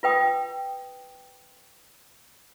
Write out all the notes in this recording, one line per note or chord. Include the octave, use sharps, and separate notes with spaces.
F4 B4 G5 D#6